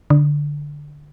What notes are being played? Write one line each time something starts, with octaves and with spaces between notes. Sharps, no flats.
D3